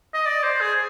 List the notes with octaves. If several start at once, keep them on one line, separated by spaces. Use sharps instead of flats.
D#5
D5
C5
G#4